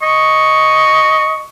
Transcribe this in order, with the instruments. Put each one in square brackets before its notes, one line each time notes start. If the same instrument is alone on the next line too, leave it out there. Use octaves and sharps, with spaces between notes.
[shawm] D#5 [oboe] C#6